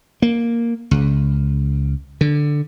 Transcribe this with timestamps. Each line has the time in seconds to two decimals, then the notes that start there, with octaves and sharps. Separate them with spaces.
0.22 A#3
0.91 C#2
2.21 D3